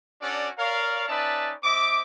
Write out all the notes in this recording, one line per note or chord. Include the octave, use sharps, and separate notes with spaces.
C#4 D4 F#4 A4 D5
A#4 C#5 D5 F5
C#4 D#4 B4 D5 E5 A5
C4 D#5 E5 D6